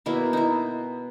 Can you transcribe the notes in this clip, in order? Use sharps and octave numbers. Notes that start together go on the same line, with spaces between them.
B2 A#3 E4
D#4 E4